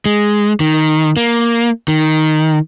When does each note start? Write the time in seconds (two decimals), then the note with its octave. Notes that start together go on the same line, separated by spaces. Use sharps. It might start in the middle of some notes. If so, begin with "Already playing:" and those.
0.06 G#3
0.60 D#3
1.17 A#3
1.88 D#3